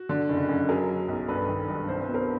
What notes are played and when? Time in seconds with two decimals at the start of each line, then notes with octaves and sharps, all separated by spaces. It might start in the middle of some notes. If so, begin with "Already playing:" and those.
Already playing: F#4
0.09 D3
0.29 F#1
0.49 F#2
0.69 F#3 G#4 A#4
0.89 F#3
1.09 B1
1.28 G2 A4 B4
1.48 D#3
1.68 G2
1.88 C2 C5
2.01 B4
2.08 B2
2.14 A#4 C5